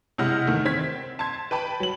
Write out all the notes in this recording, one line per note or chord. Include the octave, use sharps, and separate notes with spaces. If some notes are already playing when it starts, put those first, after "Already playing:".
C3 G#3 E4 D#5 F#5 F6
E2 D#3 A3
C4 G#6 B6
A5 C6 G#6
B4 G5 A5 B5
F#3 F#7